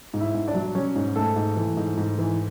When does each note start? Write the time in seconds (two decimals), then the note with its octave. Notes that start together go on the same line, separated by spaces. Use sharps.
0.14 G#2
0.20 E4 E5
0.34 G#2
0.47 D4 D5
0.55 F#3
0.75 F#3 C#4 C#5
0.96 G#2
1.16 G#2 A3 A4
1.36 G#2
1.57 E3
1.77 G#2
1.97 G#2
2.19 E3